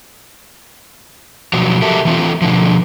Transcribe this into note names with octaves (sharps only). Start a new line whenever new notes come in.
B2 F3 F#3
F#4 G4 A4 A#4 E5
E3 A3 C4 F4
B2 D3 F3